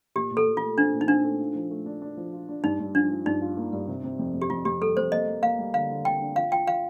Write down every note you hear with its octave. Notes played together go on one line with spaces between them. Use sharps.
A#2 G4
A#2
A4
A#2
F4
A3
C4 D4
A#2
D#4
C4 D4
A3
F4
F3
A3
D4
D4
F3
F4
D4
G2 D#4
G2
F3 D4
F3
G2 D#4
F4
A#3
G2
C3
C3
F2
F2
G4
F2 F4
F2 G4
G3 A4
F2 C5
A#3 D#5
A#3
A#3 F5
G3
D3 F5
D3
D3 G5
D4
F4 F5
F4 G5
F4 F5